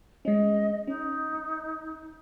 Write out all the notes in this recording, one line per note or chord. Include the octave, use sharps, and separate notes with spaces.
G#3 C#4 D#5
C#4 D#4